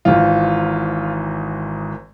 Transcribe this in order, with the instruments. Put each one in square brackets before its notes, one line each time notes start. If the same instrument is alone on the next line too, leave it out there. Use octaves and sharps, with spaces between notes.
[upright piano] G#1 G#2 E3 F4